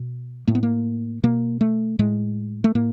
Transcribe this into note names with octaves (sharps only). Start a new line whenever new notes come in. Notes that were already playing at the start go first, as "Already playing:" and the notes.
Already playing: B2
A2 A#3
B3
A#3
B2 A#3
A3
A2 G#3
A3
A2 A#3